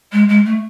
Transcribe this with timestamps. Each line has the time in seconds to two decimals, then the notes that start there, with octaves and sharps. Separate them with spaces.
0.12 G#3
0.28 G#3
0.45 A3